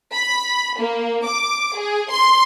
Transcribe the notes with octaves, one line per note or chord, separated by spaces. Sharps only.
B5
A#3
D6
G#4
C6